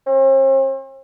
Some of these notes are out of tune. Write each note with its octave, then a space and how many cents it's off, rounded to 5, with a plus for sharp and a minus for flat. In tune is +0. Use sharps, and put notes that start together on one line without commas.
C4 +45